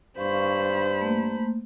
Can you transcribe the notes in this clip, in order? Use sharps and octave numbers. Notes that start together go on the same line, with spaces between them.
G2 C5 F5 B5 C#6
A3 A#3